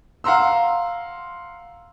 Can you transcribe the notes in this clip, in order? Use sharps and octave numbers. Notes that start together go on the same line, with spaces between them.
F5 F#5 A#5 C6 E6